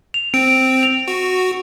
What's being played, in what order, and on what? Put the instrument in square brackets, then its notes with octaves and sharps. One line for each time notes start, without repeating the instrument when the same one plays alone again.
[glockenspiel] F7
[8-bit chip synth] C4 [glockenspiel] D7
[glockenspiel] F7
[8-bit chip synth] F#4